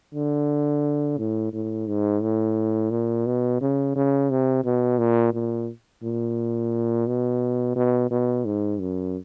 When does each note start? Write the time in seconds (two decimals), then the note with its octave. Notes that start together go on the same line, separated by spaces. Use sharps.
0.14 D3
1.18 A2
1.53 A2
1.87 G#2
2.22 A2
2.91 A#2
3.26 B2
3.61 C#3
3.96 C#3
4.30 C3
4.64 B2
4.99 A#2
5.33 A#2
6.03 A#2
7.07 B2
7.76 B2
8.11 B2
8.45 G#2
8.80 F#2